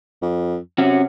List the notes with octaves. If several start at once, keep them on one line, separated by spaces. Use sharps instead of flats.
F2
C3 C#4 F#4